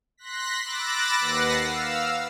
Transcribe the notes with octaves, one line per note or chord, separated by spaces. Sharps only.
C6 F#6 A#6 B6
B5 D6 E6 F#6 A6 A#6
D#2 B4 F#5 A#6 C7
F5 E6